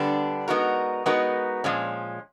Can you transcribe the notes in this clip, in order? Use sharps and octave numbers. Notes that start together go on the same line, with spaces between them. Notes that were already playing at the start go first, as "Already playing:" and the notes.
Already playing: D3 G3 B3 D4
G#3 B3 D#4 F#4 A#4
G#3 B3 D#4 F#4 A#4
A#2 F3 G#3 C#4